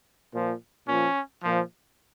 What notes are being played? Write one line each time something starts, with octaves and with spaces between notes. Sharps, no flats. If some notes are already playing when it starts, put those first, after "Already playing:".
A#2 F3
A#2 F3 C#4
A#2 F3